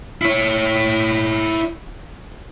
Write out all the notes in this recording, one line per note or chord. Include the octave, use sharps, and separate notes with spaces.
E4 C#5